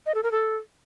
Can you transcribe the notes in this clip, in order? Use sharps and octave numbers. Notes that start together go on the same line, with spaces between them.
D#5
A4
A#4
A4